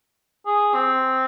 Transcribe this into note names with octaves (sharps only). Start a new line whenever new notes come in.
G#4
C4